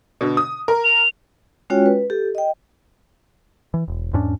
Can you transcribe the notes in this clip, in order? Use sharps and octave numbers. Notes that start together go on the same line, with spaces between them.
B2 D3
D#6
A#4
F7
G#3 C#4 F4 F#4 C#5 G5
B4
G4 A4
D#5 G5
E3
E1
E2 G#2 C#4 D4